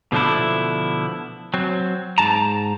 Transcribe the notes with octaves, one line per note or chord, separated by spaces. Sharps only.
B2 D3 F3 A3 D4 E4
F#3 C4
G#2 A5 A#5